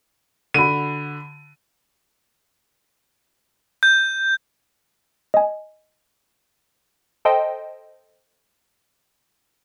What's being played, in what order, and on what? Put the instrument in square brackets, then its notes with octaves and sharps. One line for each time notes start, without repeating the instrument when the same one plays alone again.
[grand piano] D3 F#4 [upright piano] B5 D#7
[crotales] G6
[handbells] D#5 G#5
[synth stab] A4 C5 D#5 G5